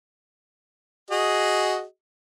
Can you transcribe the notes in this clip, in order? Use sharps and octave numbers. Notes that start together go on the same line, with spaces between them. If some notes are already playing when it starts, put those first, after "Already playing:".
F#4 G#4 D#5